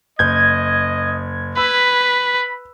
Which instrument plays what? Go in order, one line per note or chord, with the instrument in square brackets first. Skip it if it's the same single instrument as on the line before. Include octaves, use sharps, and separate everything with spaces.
[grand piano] F#1 G6 [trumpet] D#5 [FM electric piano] G#6
[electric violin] B4 [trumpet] B5 [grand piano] E6